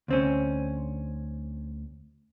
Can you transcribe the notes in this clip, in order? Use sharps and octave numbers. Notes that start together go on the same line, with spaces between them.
D2 C4 C#4